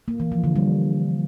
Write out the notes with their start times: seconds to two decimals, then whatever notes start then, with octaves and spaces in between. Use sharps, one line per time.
0.08 A#3
0.20 E3
0.32 F3
0.44 D3
0.56 G3